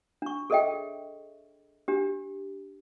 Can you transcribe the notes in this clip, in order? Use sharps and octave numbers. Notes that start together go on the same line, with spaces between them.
D4 C#6
G#4 A4 C#5 D#5 E5 G5
D4 G4